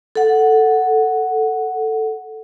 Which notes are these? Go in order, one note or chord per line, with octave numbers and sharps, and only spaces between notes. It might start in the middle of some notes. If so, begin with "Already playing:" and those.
A4 F#5